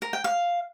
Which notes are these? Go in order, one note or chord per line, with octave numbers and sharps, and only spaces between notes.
A#4
G5
F5